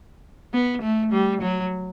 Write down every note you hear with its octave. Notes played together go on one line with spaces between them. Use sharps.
B3
A3
G3
F#3